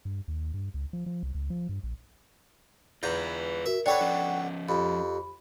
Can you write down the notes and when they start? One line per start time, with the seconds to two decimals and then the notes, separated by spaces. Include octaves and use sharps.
0.05 G2
0.28 D#2
0.54 G2
0.74 C#2
0.93 F3
1.06 F3
1.23 C2
1.35 C#2
1.50 F3
1.69 G2
1.84 A#1
3.03 E2 F4 B4 A#5 G6
3.66 F#4 A#4 E5
3.86 D4 A4 B4 C#5 D5 F#5 G5 C#6
4.01 F3 C#4
4.69 F2 G4 B5